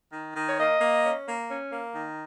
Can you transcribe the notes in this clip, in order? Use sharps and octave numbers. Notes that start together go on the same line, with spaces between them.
D#3
D#3
C#5
A#3 D#5
A#3
C#4
A#3
C#4
A#3
D#3